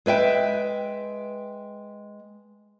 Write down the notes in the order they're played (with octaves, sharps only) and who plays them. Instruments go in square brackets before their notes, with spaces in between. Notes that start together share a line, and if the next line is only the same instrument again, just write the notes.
[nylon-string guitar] G#3 B4 E5 G5